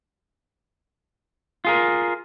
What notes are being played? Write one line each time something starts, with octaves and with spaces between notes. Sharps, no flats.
F4 G#4 A#4